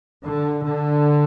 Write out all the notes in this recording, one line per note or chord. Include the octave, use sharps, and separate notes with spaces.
D3
D3